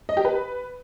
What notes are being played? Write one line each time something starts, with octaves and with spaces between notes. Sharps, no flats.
D#5
G4
B4